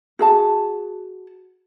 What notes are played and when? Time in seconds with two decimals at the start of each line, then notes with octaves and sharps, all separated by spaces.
0.19 F#4 G#4 A5